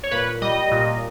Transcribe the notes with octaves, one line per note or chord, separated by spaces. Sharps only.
C#5
A#2 B4
G3 D#5
A#2